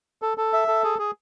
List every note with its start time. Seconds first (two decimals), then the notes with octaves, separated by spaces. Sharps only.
0.22 A4
0.38 A4
0.53 E5
0.68 A4
0.84 G#4
0.99 G#4